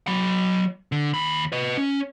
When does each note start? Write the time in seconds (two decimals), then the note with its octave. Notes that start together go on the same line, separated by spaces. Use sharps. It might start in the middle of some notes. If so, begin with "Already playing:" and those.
0.07 F#3 B5
0.92 D3
1.14 D#2 B5
1.52 B4 D#5
1.77 C#4